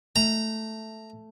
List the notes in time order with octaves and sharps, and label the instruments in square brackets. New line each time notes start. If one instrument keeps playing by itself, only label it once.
[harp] A3 [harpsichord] A#5